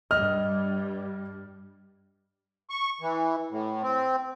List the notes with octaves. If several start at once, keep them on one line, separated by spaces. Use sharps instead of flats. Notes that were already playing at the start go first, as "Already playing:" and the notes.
G2 G3 D#5 F6
C#6
E3
A2
C4